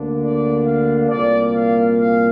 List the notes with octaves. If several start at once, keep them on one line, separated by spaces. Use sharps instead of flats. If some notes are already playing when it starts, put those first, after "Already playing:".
Already playing: D2 D3 A#3 D4
D5
F5
C2 A#2 A#3 D5
F5
F5